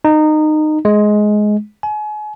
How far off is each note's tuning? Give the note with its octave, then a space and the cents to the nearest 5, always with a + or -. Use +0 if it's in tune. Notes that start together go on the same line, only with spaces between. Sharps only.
D#4 -20
G#3 +15
G#5 +35